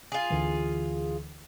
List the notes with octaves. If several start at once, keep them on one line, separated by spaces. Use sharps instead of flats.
F4 G#4
D2 D3 E3